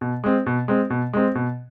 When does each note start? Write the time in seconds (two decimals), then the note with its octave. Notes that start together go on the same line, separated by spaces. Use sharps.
0.01 B2
0.24 G#3 C4
0.46 B2
0.68 G#3 C4
0.90 B2
1.13 G#3 C4
1.35 B2